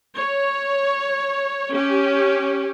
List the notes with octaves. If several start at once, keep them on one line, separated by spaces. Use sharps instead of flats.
C#5
C#4 G4